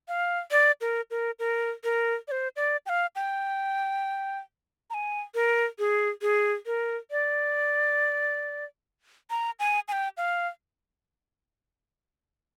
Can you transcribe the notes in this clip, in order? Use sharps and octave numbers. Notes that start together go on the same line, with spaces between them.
F5
D5
A#4
A#4
A#4
A#4
D5
C5
D5
G5
F5
G5
A#5
G#5
A#4
G#4
G#4
A#4
D5
A#5
G#5
G#5
G5
F5